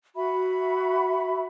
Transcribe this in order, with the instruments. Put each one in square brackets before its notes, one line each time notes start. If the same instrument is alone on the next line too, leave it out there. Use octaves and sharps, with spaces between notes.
[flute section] F#4 E5 B5